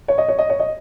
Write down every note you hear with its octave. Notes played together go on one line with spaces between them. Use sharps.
C#5
D#5
C#5
D#5
C#5
D#5